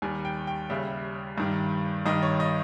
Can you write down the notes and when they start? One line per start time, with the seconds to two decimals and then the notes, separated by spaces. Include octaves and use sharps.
0.02 D#2 D#3 G3 G#5
0.25 G5
0.47 G5
0.70 D#2 C#3 G3 E5
1.38 G2 D#3 G3
2.06 G2 D#3 G3 D#5
2.23 C#5
2.40 D#5